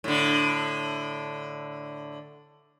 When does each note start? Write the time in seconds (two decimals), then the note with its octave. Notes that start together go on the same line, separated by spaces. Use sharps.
0.04 A2 D3